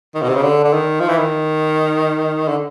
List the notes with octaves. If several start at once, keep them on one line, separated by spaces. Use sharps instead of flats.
D#3
B2
C3
C#3
D3
D3
D#3
F3
E3
D#3
D3